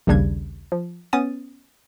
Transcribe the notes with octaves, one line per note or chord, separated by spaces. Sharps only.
A#1 D#2 C#3 G3 D4 G#6
F3
B3 C#4 D#6 A6 D#7